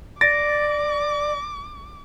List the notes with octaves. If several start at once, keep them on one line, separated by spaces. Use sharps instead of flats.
D5 D6 A6 A#6 D7